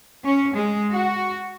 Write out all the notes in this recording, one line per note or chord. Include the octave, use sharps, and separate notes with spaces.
C#4
G#3
F#4